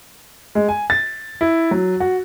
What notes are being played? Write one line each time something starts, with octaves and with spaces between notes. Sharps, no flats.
G#3
G#5
A6
E4
F#3
F#4